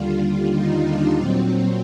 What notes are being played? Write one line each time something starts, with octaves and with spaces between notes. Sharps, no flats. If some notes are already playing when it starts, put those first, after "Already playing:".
Already playing: D#2 D3 G3 F4
D#4
D4
A#2 F#3 C4